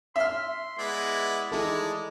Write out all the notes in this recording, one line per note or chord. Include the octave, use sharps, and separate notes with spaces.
E5 C6 F6
G#3 B3 E4 D5
G#3 D#4 E4 A4